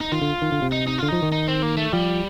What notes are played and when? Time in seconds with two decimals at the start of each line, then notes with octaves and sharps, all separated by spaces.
0.01 D#4
0.12 D#3 F4
0.22 D3
0.42 D#3
0.52 D3
0.62 C3
0.72 D#4
0.87 D#4
0.98 D3 F4
1.09 F3 D#4
1.22 D#3
1.32 D#4
1.48 C4
1.62 A#3
1.77 A3
1.93 F3 G3